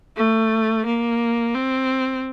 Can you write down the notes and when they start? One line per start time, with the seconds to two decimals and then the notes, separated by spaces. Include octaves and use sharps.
0.17 A3
0.86 A#3
1.55 C4